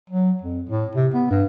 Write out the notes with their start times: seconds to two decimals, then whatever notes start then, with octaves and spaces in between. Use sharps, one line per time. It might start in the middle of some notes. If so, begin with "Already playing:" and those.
0.10 F#3
0.42 F2
0.69 A2
0.95 C3
1.14 B3
1.31 G2